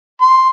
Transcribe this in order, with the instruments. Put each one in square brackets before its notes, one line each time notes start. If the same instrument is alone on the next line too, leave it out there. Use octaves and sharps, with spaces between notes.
[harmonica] C6